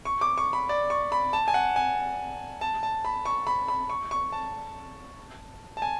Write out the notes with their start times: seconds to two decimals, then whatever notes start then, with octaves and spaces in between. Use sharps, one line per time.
0.05 C#6
0.21 D6
0.38 C#6
0.53 B5
0.69 D5
0.90 C#6
1.12 B5
1.33 A5
1.48 G#5
1.54 F#5
1.76 G#5
2.61 A5
2.83 A5
3.05 B5
3.25 C#6
3.47 B5
3.68 B5
3.90 C#6
4.11 C#6
4.32 A5
5.77 A5
5.82 G#5